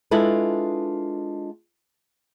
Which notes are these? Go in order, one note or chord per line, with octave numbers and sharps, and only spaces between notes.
G#3 D4 E4 F4 A4 B4